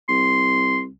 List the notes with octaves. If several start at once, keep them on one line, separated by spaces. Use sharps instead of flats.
C2 C6